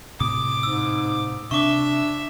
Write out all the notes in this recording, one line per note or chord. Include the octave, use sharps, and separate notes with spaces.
A2 C3 D6 D#6
G#2 E6
C3 D4 E5 C#6 D6